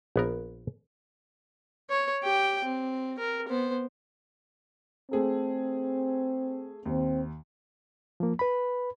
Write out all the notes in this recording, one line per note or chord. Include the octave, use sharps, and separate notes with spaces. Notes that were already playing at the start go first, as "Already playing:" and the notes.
A#1 B3 A#4
C#5
G4 G5
C4
A#4
B3 C5
A3 C4 G#4 A4
D#2 C4
F3 A#3
B4 B5